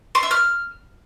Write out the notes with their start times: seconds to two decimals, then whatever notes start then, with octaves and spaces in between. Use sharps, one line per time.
0.15 C6
0.23 E5
0.31 F6